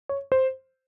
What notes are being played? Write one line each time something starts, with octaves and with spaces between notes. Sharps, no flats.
C#5
C5